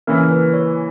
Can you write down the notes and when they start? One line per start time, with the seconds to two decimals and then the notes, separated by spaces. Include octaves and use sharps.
0.07 C#3 E3 A#3 C#4 E4 A#4
0.31 B4
0.53 C#5